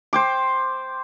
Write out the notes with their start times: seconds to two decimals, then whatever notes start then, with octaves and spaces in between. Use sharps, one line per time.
0.13 C5 G5 D6